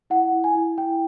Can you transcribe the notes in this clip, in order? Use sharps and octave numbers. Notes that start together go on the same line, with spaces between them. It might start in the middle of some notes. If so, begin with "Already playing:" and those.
E4 F#5
E4
G#5
E4
E4 G5